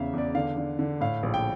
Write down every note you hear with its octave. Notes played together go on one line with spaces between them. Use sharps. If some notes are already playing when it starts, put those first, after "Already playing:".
Already playing: E2 C#3 E5 F5
E2 D5
D3 F5
D3
D3
A2 F5
A#1
G5